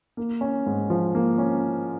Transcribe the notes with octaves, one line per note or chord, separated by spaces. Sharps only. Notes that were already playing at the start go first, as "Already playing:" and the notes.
A#3
C#4
G#2
F3
A#3
C#4